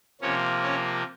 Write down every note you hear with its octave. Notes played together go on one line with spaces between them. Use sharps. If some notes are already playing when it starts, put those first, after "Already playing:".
C3 F3 A#3 C#4 C#5
C#4 C#5